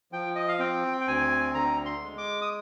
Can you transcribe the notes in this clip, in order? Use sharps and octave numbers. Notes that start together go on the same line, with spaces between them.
F3 G5
D#5
F5
C4 G5
G5
D2 G#5
D3 A#5
C6
G#3
D6
D#6